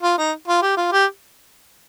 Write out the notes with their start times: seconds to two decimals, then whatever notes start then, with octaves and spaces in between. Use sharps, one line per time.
0.02 F4
0.18 D#4
0.48 F4
0.62 G4
0.77 F4
0.92 G4